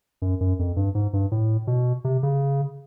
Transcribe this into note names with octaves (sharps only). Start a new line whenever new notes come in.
F#2
F#2
F2
G2
G#2
G2
A2
B2
C3
C#3